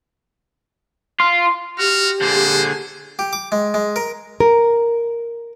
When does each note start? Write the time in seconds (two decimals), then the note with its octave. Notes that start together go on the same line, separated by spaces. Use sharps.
1.20 F4 C6
1.79 F#4 G4 F6
2.21 A#2 D3 G#4 C5
3.19 G4
3.33 D6
3.52 G#3
3.74 G#3
3.96 A#4
4.40 A#4